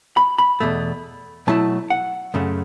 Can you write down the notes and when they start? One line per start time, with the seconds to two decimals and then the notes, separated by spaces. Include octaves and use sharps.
0.17 B5
0.38 B5
0.60 E2 B2 A3
1.47 B2 F#3 A3 E4 A5
1.90 F#5
2.34 F#2 C#3 A3